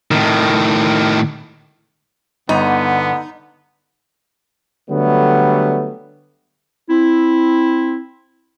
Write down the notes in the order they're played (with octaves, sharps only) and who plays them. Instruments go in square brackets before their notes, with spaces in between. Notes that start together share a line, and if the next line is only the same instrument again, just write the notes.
[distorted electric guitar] A2 D#3
[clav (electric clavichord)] G1 [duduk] D3 [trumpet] B3 [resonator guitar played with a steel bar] D#4
[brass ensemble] D3 F#3 G3 A3 B3
[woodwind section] C4 E4